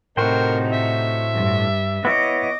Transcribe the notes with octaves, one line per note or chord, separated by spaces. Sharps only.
A2 C3 D#4 F#4 A#4 C5 G5
E5
G2
B3 E4 C#5 D#5 D6